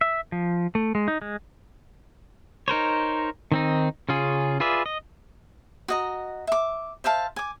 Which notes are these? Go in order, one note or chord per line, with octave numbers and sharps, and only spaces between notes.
E5
F3
A3
G#3
D#4
G#3
D#4 A#4 C5 C#5
D#3 C4 D#4
C#3 C#4 F4 G#4
F4 G#4 B4 D5 E5
D#5
F#4 D#5 A#5
E5 D6
C5 E5 F5 A5
G#5 D6